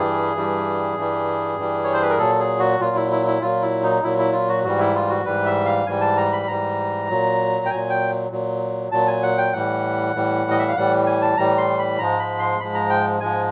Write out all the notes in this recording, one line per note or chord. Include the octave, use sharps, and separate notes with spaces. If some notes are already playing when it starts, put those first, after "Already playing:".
Already playing: G2 E3 G3 G#4
G2 E3 G3
G2 E3 G3
G2 E3 G3
C#5
C5
B4
A#4
A#2 F#3 A4
G#4
F#4
A#2 F#3 F4
E4
E4
E4
A#2 F#3 F4
E4
D#4
A#2 F#3 E4
E4
F4
F#4
G#2 E3 G3 F#4
E4
F4
F#4
G#2 E3 G3 B4
E5
F5
G#2 E3 G3 G#5
A5
A#5
B5
G#2 E3 G3 A#5
A#2 F#3
G5
A#2 F#3 G#5
G5
A#2 F#3
A#2 F#3 A5
G#5
F#5
G5
A2 E3 G3 F#5
A2 E3 G3
D#5
E5
F5
A2 E3 G3 F#5
G#5
A5
A2 E3 G3 A#5
C6
B5
G#2 F3 G#3 A#5
B5
C6
G#2 F3 G#3 B5
A#5
G5
G#2 F3 G#3 G#5